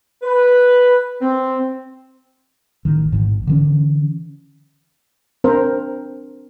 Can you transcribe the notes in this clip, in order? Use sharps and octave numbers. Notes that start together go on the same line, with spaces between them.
B4
C4
A1 D#3
A1 G#2
D3 E3 C#4
C4 D4 A#4 C5